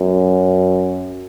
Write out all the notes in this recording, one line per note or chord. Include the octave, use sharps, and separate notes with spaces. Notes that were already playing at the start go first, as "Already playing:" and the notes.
Already playing: F#2